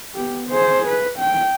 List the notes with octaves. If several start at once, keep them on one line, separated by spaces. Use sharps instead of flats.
B3 G4
G#4 C5
B4
G5